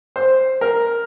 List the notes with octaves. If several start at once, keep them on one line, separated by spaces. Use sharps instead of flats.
C5
A#4